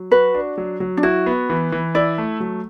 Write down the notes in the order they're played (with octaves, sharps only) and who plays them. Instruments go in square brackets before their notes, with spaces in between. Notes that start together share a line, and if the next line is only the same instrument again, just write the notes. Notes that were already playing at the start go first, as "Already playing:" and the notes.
Already playing: [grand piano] F#3
[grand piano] F#4 [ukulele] B4
[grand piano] D4
F#3
F#3
[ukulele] D4
[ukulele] E4 [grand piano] F#4
[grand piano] B3
E3
E3
[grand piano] E4 [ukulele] D5
[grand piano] A3
F#3